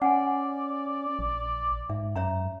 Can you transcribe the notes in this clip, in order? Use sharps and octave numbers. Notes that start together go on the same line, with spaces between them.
C#4 D5 F#5 G#5
A#1
G#2 E5
F#2 C#5 E5 A#5